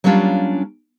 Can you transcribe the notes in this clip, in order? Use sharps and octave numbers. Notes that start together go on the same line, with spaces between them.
F#3 G3 A#3 C#4 D4 F4